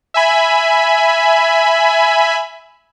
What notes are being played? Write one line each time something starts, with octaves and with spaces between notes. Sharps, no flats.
E5 G#5 B5